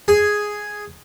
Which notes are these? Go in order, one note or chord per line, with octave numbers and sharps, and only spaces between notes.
G#4